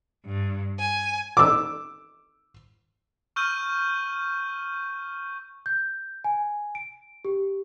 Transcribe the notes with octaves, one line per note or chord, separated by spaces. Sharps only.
G2
G#5
D6 E6
C#6 E6 F6 G6 D#7
G6
G#5
D7
G4